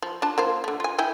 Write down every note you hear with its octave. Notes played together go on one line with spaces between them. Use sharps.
F3
D4 F4 A5
A#3 F4 C5
D3 A3
F4 G#5
E4 G5 G#5